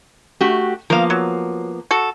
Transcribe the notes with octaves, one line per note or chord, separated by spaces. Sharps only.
A3 F#4 G4
F3 A#3 B3 A#4 F5
F#3
F#4 A4